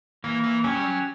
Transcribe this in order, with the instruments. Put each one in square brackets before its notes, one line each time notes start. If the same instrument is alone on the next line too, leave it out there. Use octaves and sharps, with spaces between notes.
[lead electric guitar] E3 [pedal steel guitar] A#3
[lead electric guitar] E3
[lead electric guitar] F#3 [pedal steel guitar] C#4 G4 C#5
[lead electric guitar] G3
F#3